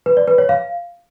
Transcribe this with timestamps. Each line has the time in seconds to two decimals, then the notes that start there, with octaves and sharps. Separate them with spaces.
0.06 B4
0.17 D5
0.28 B4
0.38 C#5
0.49 F5